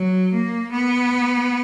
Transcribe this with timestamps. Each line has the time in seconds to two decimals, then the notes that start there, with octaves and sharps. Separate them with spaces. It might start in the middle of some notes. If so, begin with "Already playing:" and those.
Already playing: F#3
0.32 A#3
0.71 B3